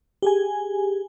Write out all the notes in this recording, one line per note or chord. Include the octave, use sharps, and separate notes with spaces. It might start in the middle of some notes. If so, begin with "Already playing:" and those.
G4 G#4 G#5